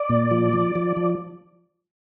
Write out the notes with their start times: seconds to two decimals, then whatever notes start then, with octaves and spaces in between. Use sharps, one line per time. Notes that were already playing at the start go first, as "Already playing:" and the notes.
Already playing: D5
0.10 A#2
0.31 F3
0.53 F3
0.75 F3
0.97 F3